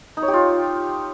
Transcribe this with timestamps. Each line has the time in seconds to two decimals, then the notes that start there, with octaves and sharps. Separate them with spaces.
0.17 D#4
0.22 C#5
0.28 G4
0.33 F4